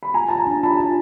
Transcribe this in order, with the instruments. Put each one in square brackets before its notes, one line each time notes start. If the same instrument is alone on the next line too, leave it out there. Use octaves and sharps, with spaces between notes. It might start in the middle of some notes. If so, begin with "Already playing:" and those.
[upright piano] B5
[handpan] F4 [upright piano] G#5 A#5
[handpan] F4 [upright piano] A5
[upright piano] G#5 A#5
[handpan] D4
[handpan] F4 [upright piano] A5 B5
[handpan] F4